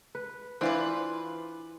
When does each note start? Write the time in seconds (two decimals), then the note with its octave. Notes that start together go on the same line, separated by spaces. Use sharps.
0.15 B4
0.61 E3 D4 F4 B4 C5